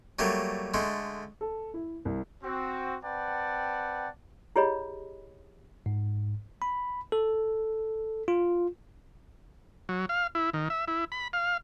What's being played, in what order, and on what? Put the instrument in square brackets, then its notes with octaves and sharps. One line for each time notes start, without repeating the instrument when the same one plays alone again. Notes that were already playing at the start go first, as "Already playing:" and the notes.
[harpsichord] F#3 G3 A3 A#3
D3 G#3 A3
[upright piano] A4
E4
C2
[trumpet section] C4 F#4
C4 B4 D5 F#5 G5 A5
[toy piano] E4 G4 G#4 C#5 D#5 B5
[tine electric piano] G#2
B5
A4
F4
[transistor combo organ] F#3
F5
E4
D#3
E5
E4
B5
F5